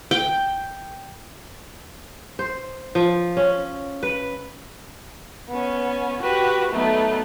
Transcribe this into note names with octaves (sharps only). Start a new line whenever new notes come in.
G5
C5
F3
C#4
B4
B3 C#4
F#4 G4 B4
F#3 A3 B3 D#4